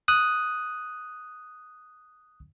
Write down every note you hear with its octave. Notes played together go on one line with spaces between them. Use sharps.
D#6 F#6